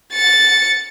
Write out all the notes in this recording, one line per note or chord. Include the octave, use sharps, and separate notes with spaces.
A6 C#7